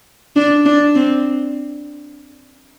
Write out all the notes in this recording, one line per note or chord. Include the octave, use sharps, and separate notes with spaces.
D4
D4
C4